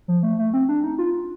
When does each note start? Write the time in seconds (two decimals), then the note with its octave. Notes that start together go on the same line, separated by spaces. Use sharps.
0.08 F3
0.23 A3
0.39 A3
0.53 C4
0.69 D4
0.84 D#4
0.99 F4